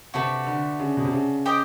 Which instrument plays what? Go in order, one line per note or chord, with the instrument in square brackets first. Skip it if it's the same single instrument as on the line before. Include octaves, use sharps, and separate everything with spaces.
[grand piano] C3 [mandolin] A3 D4 F#4 B4
[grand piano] D3
C#3
B2
C3
C#3
[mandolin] G4 C5 D#5 G5